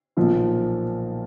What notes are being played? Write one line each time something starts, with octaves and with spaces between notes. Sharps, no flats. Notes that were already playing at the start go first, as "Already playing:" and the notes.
B1 A#2 F3